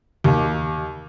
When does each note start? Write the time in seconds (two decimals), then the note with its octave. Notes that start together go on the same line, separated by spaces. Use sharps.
0.24 D#2